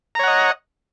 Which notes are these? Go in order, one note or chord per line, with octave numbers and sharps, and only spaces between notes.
C#5 D#5 F#5 A#5